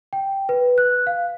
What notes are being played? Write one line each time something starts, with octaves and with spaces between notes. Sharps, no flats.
G5
B4
F#6
F5